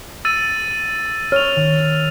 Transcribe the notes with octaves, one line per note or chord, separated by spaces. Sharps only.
E6 A6 D#7
C#5 F6 F7
D#3